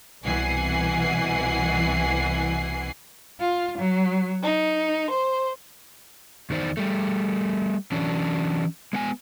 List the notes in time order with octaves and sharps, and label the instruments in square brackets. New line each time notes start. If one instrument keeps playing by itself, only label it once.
[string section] C2 B2 E3 F#5 G#5 C7
[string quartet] F4
F#3
D#4
C5
[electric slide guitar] E2 D#3 D#4 C5 D5
G3 A3
E3 F#3 C#4 D4
G#3 B3 G#5